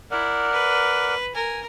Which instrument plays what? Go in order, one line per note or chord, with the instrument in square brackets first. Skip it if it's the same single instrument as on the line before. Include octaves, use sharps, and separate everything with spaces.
[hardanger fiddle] E4 [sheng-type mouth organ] A#4 D5 F#5
[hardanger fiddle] B4
[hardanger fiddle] A#4 [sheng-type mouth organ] G#5